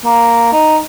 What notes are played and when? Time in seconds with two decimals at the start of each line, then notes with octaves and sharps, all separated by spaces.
0.05 A#3
0.53 D#4